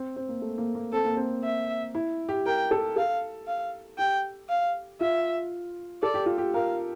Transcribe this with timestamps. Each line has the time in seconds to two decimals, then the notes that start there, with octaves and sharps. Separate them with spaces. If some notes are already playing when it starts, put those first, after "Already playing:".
Already playing: C4
0.16 C4
0.29 A#3
0.41 A3
0.58 A#3
0.75 A#3
0.92 C4 A4
1.05 A#3
1.17 C4
1.43 E5
1.95 E4
2.29 G4
2.46 A#4 G5
2.71 A4
2.96 A4 F5
3.47 F5
3.98 G4 G5
4.49 F5
5.01 F4 E5
6.03 A4 D5
6.14 G4
6.26 F4
6.38 G4
6.54 A#4 F5